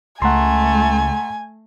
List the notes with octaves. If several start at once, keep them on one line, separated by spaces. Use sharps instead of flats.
C#2 A3 F#5 G#5 A#5 C6